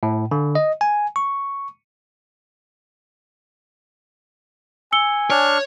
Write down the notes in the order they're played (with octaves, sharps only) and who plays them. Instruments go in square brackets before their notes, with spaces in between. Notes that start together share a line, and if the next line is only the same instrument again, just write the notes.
[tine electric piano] A2
D3
D#5
G#5
C#6
[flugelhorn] G#5 [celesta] E6 C#7 G7
[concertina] D4 F6 [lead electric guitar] C#5